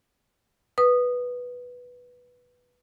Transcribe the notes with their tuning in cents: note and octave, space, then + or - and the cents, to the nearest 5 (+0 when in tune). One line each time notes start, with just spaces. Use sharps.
B4 -5 D#6 -15